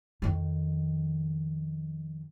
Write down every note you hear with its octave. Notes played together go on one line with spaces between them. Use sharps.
F2 D#3